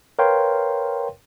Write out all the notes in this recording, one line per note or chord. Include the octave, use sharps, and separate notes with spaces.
A#4 B4 C#5 F5 G5 C6